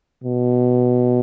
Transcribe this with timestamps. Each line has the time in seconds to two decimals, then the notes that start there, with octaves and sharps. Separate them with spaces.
0.24 B2